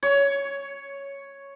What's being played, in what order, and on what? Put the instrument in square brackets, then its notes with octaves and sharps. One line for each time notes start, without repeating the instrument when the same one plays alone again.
[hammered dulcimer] C#5